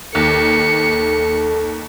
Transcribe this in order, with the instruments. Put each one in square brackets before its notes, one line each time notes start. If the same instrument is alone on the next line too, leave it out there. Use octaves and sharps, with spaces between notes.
[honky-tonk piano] D#2 [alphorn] A4 [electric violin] C#7